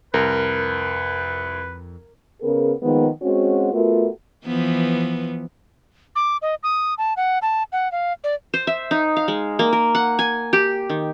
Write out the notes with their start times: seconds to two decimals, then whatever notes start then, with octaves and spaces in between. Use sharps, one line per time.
0.14 C2 F2 A#4 B4
2.41 C#3 B3 G#4 A#4
2.82 D#3 F3 G#3 A#3 B3
3.22 G#3 C4 C#4 F#4
3.73 A3 B3 F4 F#4 A#4
4.46 E3 F3 B3
6.15 D6
6.42 D#5
6.63 D#6
6.98 A5
7.17 F#5
7.42 A5
7.72 F#5
7.92 F5
8.24 D5
8.54 C5
8.67 E5
8.91 D#4
9.17 F5
9.28 G#3
9.59 A#3
9.73 A#4
9.95 F#5
10.19 G#5
10.53 G4
10.90 D#3